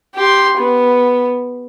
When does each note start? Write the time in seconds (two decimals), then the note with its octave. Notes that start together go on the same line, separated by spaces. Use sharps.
0.15 G4 C6
0.58 B3